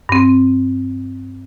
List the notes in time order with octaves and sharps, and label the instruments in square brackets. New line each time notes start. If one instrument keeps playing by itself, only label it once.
[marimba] G2 C4